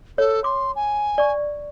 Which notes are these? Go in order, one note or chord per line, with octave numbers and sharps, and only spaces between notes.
A4 C#5
C6 D6
G#5
D5 C#6